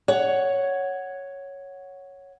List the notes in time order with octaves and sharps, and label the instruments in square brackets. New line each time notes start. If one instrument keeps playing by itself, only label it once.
[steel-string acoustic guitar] C#5 F#5